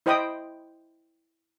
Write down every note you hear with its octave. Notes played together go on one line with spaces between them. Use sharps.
E4 C5 D#5 G5 B5 D#6